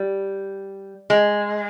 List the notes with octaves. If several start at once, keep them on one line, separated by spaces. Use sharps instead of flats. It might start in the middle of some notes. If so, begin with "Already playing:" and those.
Already playing: G3
G#3